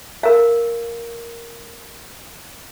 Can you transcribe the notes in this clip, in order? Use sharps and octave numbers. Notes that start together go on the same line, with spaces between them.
A#4 F5